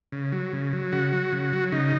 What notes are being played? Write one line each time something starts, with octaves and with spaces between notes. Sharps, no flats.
C#3
F#3
C#3
F#3
C#3 F#4
F#3
C#3
F#3
C#3 D#4